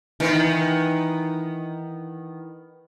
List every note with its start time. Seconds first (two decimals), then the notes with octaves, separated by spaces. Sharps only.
0.20 D#3 E3 B3 D#4 A#4